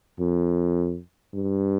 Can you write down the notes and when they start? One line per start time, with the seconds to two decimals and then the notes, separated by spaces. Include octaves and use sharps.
0.20 F2
1.34 G2